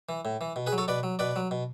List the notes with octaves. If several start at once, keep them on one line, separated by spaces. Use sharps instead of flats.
E3
A2
E3
B2
G#4 B4
F#3
A4 C#5
B2 B4 D5
F#3
B2 B4 D5
F#3
B2